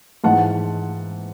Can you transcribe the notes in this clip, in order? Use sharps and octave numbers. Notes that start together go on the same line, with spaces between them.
G#2 E3 F#5 A5